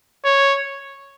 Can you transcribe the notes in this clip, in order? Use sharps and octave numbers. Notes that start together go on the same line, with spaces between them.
C#5